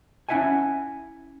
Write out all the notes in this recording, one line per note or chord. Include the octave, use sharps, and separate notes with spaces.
C#4 E4 E5 F#5 G#5